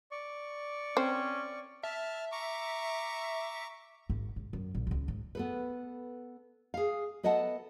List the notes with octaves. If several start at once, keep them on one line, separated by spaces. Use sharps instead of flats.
D5 C#6
C4 C#4
E5 A5 F6
A#5 C#6 D6
G#1 G#2
G#2
F#2
A#1
C#2 A2
G#2
B3 A4 B4
G#4 F5
B3 A4 D#5 E5 F#5 A5